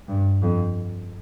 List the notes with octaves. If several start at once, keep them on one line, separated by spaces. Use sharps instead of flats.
G2
F2